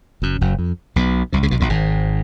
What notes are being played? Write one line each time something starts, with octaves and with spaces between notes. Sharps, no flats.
F#1 F#2
F#1 F#2
F2
B1 B2
C2 C3
C#2 C#3
B1 B2
A#1 A#2
G#1 G#2